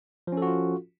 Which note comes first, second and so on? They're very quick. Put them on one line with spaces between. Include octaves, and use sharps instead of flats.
F3 C#4 A4 F#4 F4